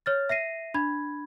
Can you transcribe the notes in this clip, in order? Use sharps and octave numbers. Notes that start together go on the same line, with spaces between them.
C#5 F6 A6
E5 A#6 C7 D#7
D4 B5 G#6